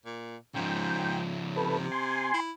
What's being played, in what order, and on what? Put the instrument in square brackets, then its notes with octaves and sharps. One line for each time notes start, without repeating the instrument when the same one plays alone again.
[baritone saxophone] A#2
[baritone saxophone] G#2 [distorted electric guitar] C#3 F3 [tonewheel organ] G5
[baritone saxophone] C3 [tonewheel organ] A4 B4
[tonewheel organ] G#5 C6
[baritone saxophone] E4